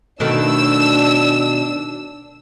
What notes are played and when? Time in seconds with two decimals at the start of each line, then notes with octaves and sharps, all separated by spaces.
0.20 B2 D#3 A3 D4 E6